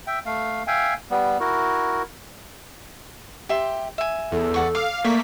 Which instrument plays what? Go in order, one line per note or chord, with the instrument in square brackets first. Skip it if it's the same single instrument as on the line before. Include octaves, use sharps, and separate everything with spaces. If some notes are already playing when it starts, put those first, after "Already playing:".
[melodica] E5 G5
A3 F5
E5 F5 G5 G#5
G3 B3
E4 F#4 A#4
[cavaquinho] G4 E5 C6
E5 G#5
[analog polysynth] E2 [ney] A4
[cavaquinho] D5 F#5 C#6
[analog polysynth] F5 [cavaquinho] D6
[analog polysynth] A3 A#3 B6 [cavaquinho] A#4 D5 C#6